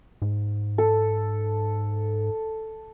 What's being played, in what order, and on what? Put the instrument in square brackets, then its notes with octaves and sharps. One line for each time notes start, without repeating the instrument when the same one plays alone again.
[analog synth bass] G#2
[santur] A4